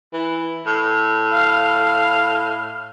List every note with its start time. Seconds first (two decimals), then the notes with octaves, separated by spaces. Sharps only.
0.13 E3
0.66 A2
1.33 F5